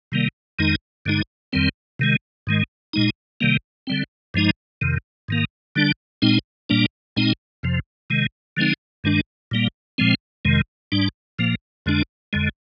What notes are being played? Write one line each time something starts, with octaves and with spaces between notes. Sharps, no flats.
C3 D#3 G3 A#3
F2 D#3 G#3 D#4
G2 D3 G#3 D#4
F2 D#3 G3 C4
C3 D#3 G#3
G#2 D#3 G#3
A#2 G#3 D#4
C3 D#3 G3 A#3
D3 G3 C4
G2 F3 G#3 D#4
F2 C3 D#3
G#2 D#3 A#3
D3 G3 D4
A#2 G#3 C4 D#4
A#2 G3 A#3 D4
A#2 G#3 C4 D#4
F2 C3 F3
C3 D#3 G#3
D3 F3 G#3 C4 D#4
G2 D#3 G#3 D4
A#2 G3 A#3
A#2 F3 G#3 C4
F2 C3 D#3 G#3
G#2 G3 D4
A#2 F3 A#3
F2 D3 G#3 D4
F2 D3 G#3